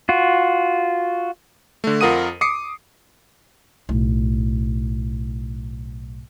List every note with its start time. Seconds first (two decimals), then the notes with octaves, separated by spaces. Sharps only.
0.09 F4 F#4
1.84 D3 A3
2.01 F2 F4 A#4 F#5 D#6 D#7
2.41 D6 D#6 C7 C#7
3.89 B1 A2